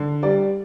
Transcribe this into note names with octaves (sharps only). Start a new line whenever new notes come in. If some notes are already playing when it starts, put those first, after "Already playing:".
Already playing: D3
G3 D5